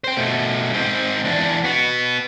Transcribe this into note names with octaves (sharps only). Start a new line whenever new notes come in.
C5 G5
B2 A3
G#2 C4
E2 D4
B3 F#4